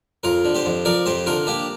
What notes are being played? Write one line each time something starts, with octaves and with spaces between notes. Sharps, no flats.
F2 F4 A#4
D3
G4 C5
F2
F3 A#4 D5
F2 G4 C5
D3 F4 A#4
A#3 D4 G4